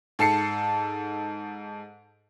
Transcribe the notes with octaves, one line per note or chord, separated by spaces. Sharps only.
G#2 A4 A5 C7 C#7